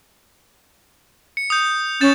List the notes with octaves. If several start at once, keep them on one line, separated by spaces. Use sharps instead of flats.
C#7
D#6 G6
C#4 G6 A6 E7